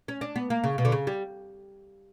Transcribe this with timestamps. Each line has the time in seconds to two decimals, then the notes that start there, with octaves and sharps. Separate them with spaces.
0.08 C#4
0.21 D4
0.36 B3
0.50 A#3
0.64 C#3
0.78 B2
0.85 D3
0.92 C#3
1.07 G3